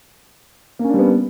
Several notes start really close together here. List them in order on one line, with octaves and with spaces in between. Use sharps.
A#3 C#4 D4 G3 B3